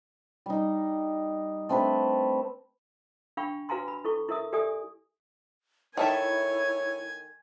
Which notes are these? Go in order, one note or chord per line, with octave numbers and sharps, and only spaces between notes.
G3 D#4
A3 C4 D4 B4
D4 F5 G5 B5 C#6
F#4 B4 F5 G#5 A#5 C6
B5
E4 A4 C#6
E4 A#4 E5 D#6
G4 A4 D5 E5 G#5 D#6
D#3 E4 A4 C#5 E5 G#5